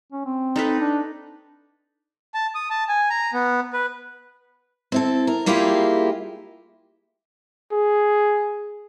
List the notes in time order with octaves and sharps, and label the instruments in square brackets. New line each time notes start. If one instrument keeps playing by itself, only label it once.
[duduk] C#4
C4
[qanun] D#4 A4 B4
[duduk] D4
[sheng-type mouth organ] A5
D#6
A5
G#5
A#5
B3
B4
[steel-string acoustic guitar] C4 E4 A4
A#4
G3 A#3 E4 F4 G4 G#4
[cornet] G#4